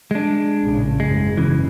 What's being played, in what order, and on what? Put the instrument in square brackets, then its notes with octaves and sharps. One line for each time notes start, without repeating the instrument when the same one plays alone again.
[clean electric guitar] G#3 D4
[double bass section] A#1 A2 C#3
[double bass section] F#1 G#2 [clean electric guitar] G#3
[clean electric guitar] C#3 E3